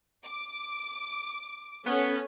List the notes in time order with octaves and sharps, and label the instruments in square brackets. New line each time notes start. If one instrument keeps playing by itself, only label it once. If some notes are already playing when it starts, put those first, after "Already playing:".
[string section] D6
[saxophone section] B3 [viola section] C#4 A4